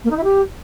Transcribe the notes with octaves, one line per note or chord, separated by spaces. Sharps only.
A#3
D#4
E4
G4